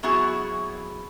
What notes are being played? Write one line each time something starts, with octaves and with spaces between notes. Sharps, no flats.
F#3 B3 E4 F#4 G#4